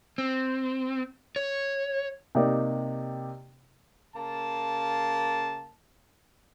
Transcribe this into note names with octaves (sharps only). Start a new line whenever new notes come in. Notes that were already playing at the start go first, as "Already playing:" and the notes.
C4
C#5
C3 A#3 D#4 G4 D5
C#3 A#3 A5